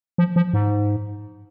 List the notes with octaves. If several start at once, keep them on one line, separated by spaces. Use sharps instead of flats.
F3
F3
G#2